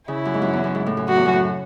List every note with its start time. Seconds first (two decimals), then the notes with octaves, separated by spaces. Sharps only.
0.08 C#3 E4
0.25 F#2
0.34 G#2
0.42 F#2
0.53 E2
0.64 F#2
0.75 G#2
0.86 A2
0.97 F#2
1.08 F#2 F#4
1.16 E2
1.26 F#2
1.33 A2